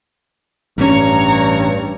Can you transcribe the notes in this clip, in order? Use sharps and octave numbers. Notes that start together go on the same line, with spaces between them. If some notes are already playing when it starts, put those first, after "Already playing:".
A1 G2 C#4 C#5 A#5